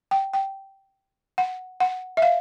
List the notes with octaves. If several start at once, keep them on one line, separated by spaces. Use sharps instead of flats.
G5
G5
F#5
F#5
E5
F5